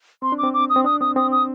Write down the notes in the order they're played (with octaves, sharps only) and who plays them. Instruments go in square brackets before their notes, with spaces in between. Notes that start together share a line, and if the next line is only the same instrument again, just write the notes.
[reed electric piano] C4 [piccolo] C6
[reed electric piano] D4
[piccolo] D6
[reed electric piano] C4
[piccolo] D6
D#6
[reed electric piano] C4
[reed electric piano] D4 [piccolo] D#6
[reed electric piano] C4 [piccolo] D#6
[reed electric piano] C4 [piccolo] D#6
[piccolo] D#6